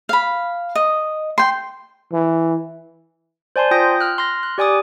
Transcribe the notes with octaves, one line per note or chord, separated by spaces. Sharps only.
F5 B5
D#5
G5 C6
E3
C5 D5 G#5 A5 C6
F4 G5 D#6 G6 A#6
F6 F#6
C6 F6 A#6
F#6
G4 D5 G#5 D6 D#6